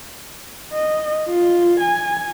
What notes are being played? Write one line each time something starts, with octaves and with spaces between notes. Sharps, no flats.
D#5
F4
G#5